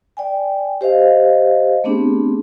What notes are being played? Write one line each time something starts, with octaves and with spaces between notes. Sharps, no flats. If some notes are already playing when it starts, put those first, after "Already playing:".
D5 G5 G#5
G4 C5 D#5 F5
A3 B3 C4 D4 G4 G#4